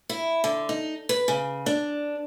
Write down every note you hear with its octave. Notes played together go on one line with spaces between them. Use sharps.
E4
D3
D#4
B4
C#3
D4